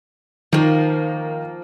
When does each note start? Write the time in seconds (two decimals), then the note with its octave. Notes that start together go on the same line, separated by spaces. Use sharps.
0.53 D#3 F3 A#3